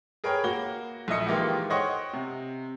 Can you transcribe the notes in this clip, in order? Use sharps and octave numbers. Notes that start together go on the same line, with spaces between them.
G#4 A#4 B4 C#5 G5 B5
A#3 F#4 G7
A#1 E4 D#5 C#7
D#3 E3 G#3 A#3 F4 G4
C5 C#5 D#5 F#5 G5 C#6
C3